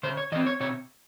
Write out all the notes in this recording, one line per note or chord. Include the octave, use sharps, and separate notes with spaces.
C#3 C5
C#5
E3 C4 D#5
C#5
C3 C#5